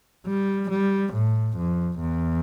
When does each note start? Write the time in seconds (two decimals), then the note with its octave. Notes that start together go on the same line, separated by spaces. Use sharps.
0.26 G3
0.70 G3
1.14 A2
1.57 F2
2.01 E2